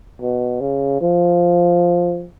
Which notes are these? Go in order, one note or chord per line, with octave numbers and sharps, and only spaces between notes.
B2
C#3
F3